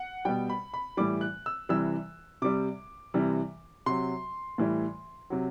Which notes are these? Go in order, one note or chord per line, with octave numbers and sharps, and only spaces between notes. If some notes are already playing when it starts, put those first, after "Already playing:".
Already playing: F#5
B2 G3 G5
B5
B5
A2 E3 G3 D6
F#6
E6
C3 E3 G3 E6
C3 G3 D6
C3 E3 G3
C3 F#3 C6
A2 E3 G3
C3 F#3